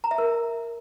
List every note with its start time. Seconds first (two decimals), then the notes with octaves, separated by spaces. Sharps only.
0.04 A#5
0.11 E5
0.18 A#4